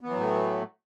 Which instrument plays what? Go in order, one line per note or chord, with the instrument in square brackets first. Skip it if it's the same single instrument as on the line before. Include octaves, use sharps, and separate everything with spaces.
[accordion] B3
E3
F#3
A2
A3